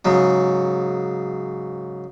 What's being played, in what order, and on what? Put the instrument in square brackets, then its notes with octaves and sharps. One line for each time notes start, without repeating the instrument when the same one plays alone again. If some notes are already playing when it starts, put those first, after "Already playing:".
[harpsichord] G#2 C#3 F#3 B3